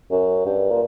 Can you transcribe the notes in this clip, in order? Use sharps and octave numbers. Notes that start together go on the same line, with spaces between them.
F#2
G2
A#2